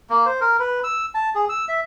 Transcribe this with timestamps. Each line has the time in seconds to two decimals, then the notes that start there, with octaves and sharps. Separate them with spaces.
0.10 A#3
0.26 C5
0.41 A#4
0.60 B4
0.84 E6
1.15 A5
1.35 G#4
1.49 E6
1.68 E5